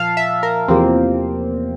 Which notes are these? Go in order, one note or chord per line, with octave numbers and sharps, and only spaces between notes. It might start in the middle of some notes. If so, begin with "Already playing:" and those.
Already playing: A#2 F3 F5 A5
E5
A#4
E2 C3 F3 A#3 C4